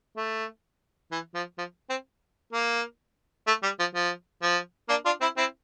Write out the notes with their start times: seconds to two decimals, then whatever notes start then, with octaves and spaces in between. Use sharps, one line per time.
0.17 A3
1.11 E3
1.35 F3
1.58 F3
1.90 C4
2.53 A#3
3.47 A3
3.63 G3
3.80 F3
3.95 F3
4.42 F3
4.89 A#3 D4
5.05 D4 F4
5.21 C4 E4
5.37 C4 E4